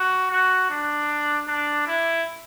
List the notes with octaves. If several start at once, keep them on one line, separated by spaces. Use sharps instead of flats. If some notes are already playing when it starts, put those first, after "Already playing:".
Already playing: F#4
F#4
D4
D4
E4